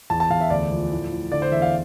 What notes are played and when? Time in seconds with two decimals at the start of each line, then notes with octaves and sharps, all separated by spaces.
0.10 E2 A5
0.20 A5
0.30 E2 F5
0.41 E5
0.50 D2 D5
0.71 F3
0.92 A2
1.12 A2
1.32 D3 D5
1.42 C5
1.52 E2 E5
1.62 F5